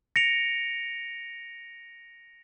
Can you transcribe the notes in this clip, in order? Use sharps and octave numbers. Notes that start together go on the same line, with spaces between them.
A#6 C#7 D7 F7